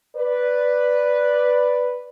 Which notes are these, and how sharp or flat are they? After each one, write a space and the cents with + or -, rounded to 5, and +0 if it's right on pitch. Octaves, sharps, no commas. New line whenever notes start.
B4 +0 D5 +0